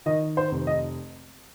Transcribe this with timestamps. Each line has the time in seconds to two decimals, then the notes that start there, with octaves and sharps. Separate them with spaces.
0.06 D#3 D#5
0.37 C5
0.51 F1
0.67 D#5